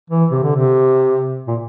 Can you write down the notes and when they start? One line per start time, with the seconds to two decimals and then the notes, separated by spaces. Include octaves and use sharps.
0.10 E3
0.31 C3
0.43 D3
0.56 C3
1.48 A#2